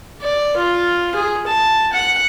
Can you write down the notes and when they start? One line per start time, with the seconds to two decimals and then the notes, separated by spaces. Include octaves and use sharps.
0.22 D5
0.56 F4
1.15 G#4
1.47 A5
1.92 F#5